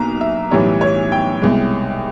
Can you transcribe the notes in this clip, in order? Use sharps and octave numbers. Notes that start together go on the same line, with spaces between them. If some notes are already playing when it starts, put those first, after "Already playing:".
Already playing: B1 B2 A#3 A#5
E5
B1 A2 E3 G3 C#5
C#5
G5
C2 B2 G#3